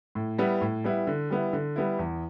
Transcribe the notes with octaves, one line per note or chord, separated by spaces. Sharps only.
A2
G3 B3 E4
A2
G3 B3 E4
D3
G3 B3 E4
D3
G3 B3 E4
E2